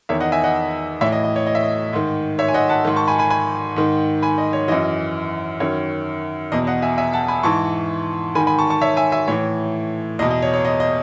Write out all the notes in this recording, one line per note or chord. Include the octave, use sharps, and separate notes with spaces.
E2 D#3 C#5 E5
D#5 F#5
E5 G#5
D#5 F#5
A2 E3 C#5 E5
D#5
D#5
C#5
D#5
E5
D#5
G#2 D#3
C#5 E5
G#5
D#5 F#5
F#5 A5
G#2 D#3
A5 C#6
G#5 B5
G#5 B5
G#5 B5
G#2 D#3
G#5 B5
D#5
C#5
F#2 E3 D#5
F#2 D#3 C#5
E2 B2 D#5
D#5 F#5
E5 G#5
E5 G#5
F#5 A5
G#5 B5
G#2 E3 A5 C#6
G#2 D#3 G#5 B5
G#5 B5
A5 C#6
A5 C#6
C#5 E5
E5 G#5
E5 G#5
A2 E3 C#5
E2 B2 D#5
D#5
C#5
C#5
D#5
D#5